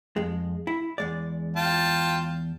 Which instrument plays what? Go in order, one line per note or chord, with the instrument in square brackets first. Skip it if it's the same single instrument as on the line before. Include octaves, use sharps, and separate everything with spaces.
[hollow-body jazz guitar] F2 G#3
E4
E2 G#3 D5
[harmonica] F4 G5 A5